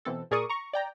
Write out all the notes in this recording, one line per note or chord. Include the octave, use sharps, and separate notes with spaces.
B2 E3 C4 A4
A#2 G#4 A#4 D5 C#6 D#6
A#5 C#6
D5 G5 A#5